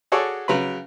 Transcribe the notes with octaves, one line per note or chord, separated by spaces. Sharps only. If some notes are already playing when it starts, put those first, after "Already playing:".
F#4 G#4 A4 C#5 D5
C#3 F#3 B4 B5